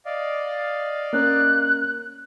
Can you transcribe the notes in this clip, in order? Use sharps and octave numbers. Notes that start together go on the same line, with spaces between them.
D5 D#5 F5
A#3 C#4 A#4 F#6